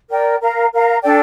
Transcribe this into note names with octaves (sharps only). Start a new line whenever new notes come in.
A#4 D5 G5
A#4 F5 A#5
A#4 F5 A#5
D4 A4 D5 G5